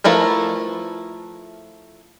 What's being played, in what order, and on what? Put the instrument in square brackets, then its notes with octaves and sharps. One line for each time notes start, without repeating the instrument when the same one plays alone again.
[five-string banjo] F3 A3 E4 A#4 B4